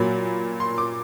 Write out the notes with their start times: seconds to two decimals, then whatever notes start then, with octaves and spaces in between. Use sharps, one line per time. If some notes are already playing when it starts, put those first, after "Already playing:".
Already playing: A#2 F#3 A#3 B5
0.60 C6
0.78 D6